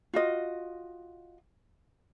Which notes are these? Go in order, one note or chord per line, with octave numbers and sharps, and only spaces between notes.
F4 F#4 D#5